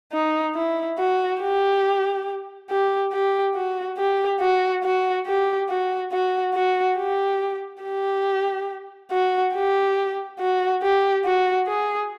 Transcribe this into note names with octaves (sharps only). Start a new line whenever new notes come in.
D#4
E4
F#4
G4
G4
G4
F#4
G4
F#4
F#4
G4
F#4
F#4
F#4
G4
G4
F#4
G4
F#4
G4
F#4
G#4